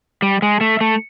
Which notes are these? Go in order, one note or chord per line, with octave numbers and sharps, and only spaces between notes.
G3
G#3
A3
A3